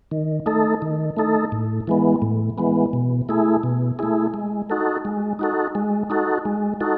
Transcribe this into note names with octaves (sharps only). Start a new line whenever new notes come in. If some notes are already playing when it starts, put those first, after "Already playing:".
D#3
A3 D#4 A4
D#3
A3 D#4 A4
A2
E3 G#3 B3
A2
E3 G#3 B3
B2
A3 E4 G#4
B2
A3 E4 G#4
G#3
D#4 F#4 A4
G#3
D#4 F#4 A4
G#3
D#4 F#4 A4
G#3
D#4 F#4 A4